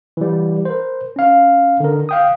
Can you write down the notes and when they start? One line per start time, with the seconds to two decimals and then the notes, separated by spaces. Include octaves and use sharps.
0.17 E3 G3
0.65 A#4 C5
1.16 C#4 F5
1.80 D3 A#4
2.09 F5 G5 D#6